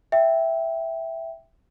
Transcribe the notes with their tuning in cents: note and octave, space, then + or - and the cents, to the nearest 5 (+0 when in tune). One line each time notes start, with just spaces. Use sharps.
E5 +0 G5 +0